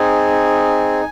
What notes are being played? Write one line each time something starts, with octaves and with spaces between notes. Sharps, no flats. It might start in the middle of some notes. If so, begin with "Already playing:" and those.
Already playing: C4 D#4 G#4 G#5